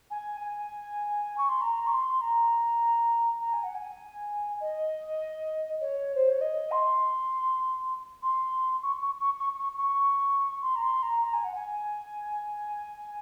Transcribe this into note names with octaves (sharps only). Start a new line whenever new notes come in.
G#5
G#5
C#6
C6
A#5
C#6
C6
A#5
A#5
G#5
F#5
G#5
D#5
C#5
C5
C#5
D#5
C6
C6
C#6
C#6
C#6
C#6
C#6
C#6
C6
A#5
C6
A#5
A#5
G#5
F#5
G#5